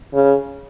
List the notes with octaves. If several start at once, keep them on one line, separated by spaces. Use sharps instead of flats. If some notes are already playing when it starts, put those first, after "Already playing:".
C#3